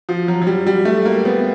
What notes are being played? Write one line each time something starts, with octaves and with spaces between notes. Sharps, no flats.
F3
F#3
F#3
G3
G3
A3
A#3
B3